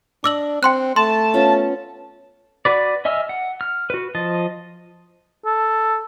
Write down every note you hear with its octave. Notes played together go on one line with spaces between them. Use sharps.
D4 D#5 D6 E6 F#7
C4 G5 C6 F#6
A3 A5 C6
B3 C#4 F4
F#4 B4 D5
D#5 E5 G#5 E6 F6
F#5
F6
F#4 B4
F3 D#5 A5
A4